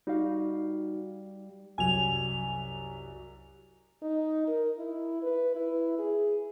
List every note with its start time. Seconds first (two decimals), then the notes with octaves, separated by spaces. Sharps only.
0.07 G3 D#4 F#4 F5
1.78 C2 F#2 F#3 G#5 F7
4.02 D#4
4.47 A#4
4.78 E4
5.22 B4
5.55 E4
5.99 G#4